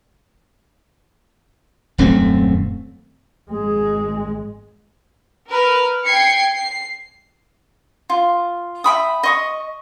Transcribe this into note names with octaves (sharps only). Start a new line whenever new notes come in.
D#1 F#2 A3 C4
G#1 G#3 G#4
A#4 B4 F6
G5 G#6 C7 C#7
C7
F4
E5 G5 B5 D#6
D#5 C#6 D#6